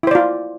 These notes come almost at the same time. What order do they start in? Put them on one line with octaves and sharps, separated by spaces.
E4 C5 D5 F4